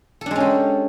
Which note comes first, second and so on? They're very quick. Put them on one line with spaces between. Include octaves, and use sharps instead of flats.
A4 D4 G#3 C#4 G4